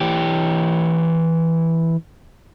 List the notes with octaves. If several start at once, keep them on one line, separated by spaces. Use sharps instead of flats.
E3 G4